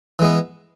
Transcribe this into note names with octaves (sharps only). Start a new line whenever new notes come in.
E3 G#3 B3